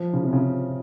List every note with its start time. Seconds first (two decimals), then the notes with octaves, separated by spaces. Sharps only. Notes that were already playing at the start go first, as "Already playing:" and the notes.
Already playing: F3
0.13 C#3
0.23 C3
0.33 C#3